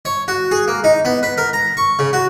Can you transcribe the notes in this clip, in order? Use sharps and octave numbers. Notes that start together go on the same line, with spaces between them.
C#5
F#4
G#4
A#3
D#4
B3
B4
A#4
A#5
C#6
C#3
F#4